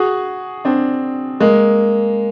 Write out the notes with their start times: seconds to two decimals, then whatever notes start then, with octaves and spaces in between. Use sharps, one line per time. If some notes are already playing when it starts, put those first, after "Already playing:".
Already playing: F#4 G#4
0.65 C4 D4
1.40 G#3 A#3